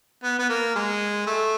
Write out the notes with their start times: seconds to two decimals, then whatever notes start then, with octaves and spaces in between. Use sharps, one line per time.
0.24 B3
0.39 B3
0.49 A#3
0.76 G#3
1.27 A3